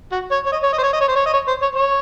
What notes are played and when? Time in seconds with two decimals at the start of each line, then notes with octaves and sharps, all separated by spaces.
0.12 F#4
0.31 C#5
0.46 C#5
0.52 D#5
0.63 C#5
0.73 D#5
0.78 C5
0.83 C#5
0.93 D#5
1.01 C#5
1.08 C5
1.16 C#5
1.26 D#5
1.34 C#5
1.48 C5
1.62 C#5
1.76 C#5